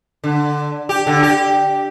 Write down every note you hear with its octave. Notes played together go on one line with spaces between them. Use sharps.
D3
G4
D3
G4